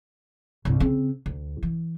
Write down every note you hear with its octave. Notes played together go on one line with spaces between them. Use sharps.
C2 G2
C#3 C4
D2
E3